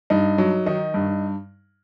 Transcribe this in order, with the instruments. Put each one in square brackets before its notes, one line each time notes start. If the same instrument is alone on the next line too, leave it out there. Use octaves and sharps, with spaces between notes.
[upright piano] G2 D#4
F#3
D#3 D#4
G2